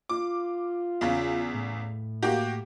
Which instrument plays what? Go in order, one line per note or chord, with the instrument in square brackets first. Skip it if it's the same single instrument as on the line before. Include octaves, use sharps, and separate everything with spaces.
[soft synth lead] F4 [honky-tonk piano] D6
[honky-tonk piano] E2 C#3
[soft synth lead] A2
[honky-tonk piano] A#3 F#4 G4